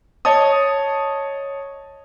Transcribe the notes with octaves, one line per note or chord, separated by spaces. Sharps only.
C#5 D#5 A5 D#6